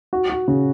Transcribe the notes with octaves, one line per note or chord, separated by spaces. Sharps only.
F#4
F#4
C#3